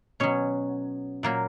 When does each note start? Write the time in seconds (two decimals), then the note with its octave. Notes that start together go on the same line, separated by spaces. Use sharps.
0.20 B2 F#3 C#4 C#5
1.23 A#2 F#3 A#3 A#4